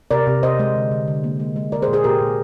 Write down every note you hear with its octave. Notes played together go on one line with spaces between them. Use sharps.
C3 A#4 D5
C3
C3 C5 D#5
G#3
D3
D3
D3
A#3
G#3
G#3
G#3 A#4 D5
G#4 C5
A#2
G#4 C5
A#2 G4 A#4
A#2